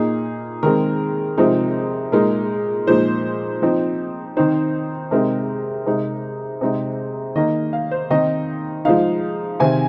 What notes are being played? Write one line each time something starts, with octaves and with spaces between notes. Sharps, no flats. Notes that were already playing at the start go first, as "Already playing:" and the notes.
Already playing: A#2 A#3 D#4 G#4
D#3 G#3 C4 A#4
C3 F3 G#3 C4 D#4
A#2 G#3 D#4 A#4
A#2 F3 G#3 D#4 C5
F3 C4 D#4
D#3 C4 D#4 C5
C3 G#3 C4 D#4 A#4
C3 G#3 D#4
C3 G#3 C4 D#4
D#3 A#3 D#4 D#5
F5
C5
D#3 C4 D#4 D#5
F3 G#3 D#4 F5
C3 D#3 C4 G#5